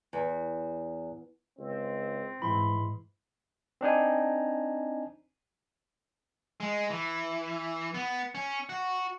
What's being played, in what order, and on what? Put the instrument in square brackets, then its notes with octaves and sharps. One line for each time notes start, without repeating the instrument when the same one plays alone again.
[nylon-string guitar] E2
[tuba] C#2 [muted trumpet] C4
[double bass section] G#2 [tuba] E3 [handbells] B5 C6
[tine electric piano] C4 D4 D#4 G#5
[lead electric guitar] G#3
E3
B3
C#4
F#4